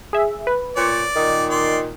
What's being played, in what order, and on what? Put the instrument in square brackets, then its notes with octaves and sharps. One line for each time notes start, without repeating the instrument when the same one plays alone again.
[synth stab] G#4 E5
B4
[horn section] A#2 C#5 [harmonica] D5
[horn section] A#2 D#3
[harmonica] D5 C6